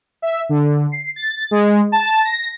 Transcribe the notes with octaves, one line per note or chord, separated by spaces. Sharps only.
E5
D3
C7
A6
G#3
A5
A#6